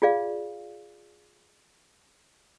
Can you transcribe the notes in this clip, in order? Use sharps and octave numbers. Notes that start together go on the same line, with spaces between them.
F4 G#4 D5 F5